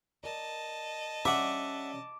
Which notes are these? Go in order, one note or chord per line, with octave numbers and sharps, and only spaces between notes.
A#4 D5 D#5 A5
G3 C#4 D5 E5 F#5 D6